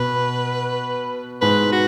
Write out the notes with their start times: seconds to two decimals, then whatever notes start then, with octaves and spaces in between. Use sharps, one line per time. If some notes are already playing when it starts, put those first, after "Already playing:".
Already playing: B2 B4
1.41 G#2 B4
1.72 F#4